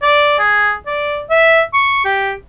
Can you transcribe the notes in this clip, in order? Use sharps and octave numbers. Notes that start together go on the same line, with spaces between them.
D5
G#4
D5
E5
C#6
G4